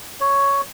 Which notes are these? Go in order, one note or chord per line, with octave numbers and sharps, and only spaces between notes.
C#5